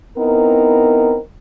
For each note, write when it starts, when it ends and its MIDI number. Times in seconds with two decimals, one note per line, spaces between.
0.18 1.17 59
0.18 1.17 60
0.18 1.17 63
0.18 1.17 64
0.18 1.17 70